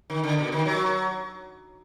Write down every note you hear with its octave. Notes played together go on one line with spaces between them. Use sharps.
D#3
D3
B2
D#3
F#3